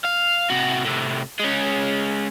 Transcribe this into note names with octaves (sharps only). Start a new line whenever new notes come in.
F5
C3 F#4
A2 C3
G#3 C#4